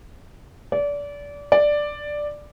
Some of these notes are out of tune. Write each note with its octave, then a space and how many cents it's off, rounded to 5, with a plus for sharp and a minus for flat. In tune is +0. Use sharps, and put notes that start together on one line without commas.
D5 -25
D5 +5